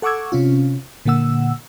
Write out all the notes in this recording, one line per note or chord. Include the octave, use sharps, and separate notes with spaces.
A4 F#5 C#6 D6 E6 G#6
C3 C#4 F4
A#2 D3 A#3 F#5 E6